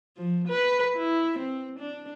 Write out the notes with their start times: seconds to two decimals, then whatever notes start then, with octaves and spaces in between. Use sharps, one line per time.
0.17 F3
0.48 B4
0.96 E4
1.38 C4
1.79 D4